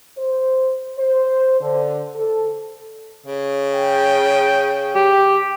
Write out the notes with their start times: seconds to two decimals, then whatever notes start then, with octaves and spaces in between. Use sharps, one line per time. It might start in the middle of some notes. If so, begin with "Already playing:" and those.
0.18 C5
0.99 C5
1.61 D3
2.15 A4
3.26 C#3
3.75 G5
4.95 G4